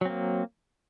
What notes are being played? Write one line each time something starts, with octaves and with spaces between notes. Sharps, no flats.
F#3 A#3 C4